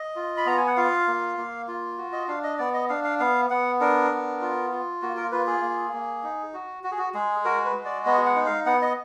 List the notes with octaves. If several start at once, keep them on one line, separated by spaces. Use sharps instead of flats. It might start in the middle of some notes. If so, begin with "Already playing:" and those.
Already playing: D#5
F4
B5
B3 A#5
G#5
F#5
F4 F5
A#3
A#3
F4
F#4
D#5
D4 F5
D#5
B3 D5
D#5
D4 F5
F5
B3 F5
B3 F#5
D4 A#4
B3
F4
F4
A#3 F#4
A#4
F4 B4
G#4
A#3
A#3
D#4
F#4
F#4
G#4
F#4
G#3 G#4
F#4 A#4
B4
G#3
D5
B3 D#5
F#5
D#4
F5
B3 F#5
D#5